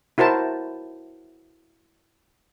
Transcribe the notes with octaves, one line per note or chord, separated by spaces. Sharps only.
E4 F#4 A#4 C5 A5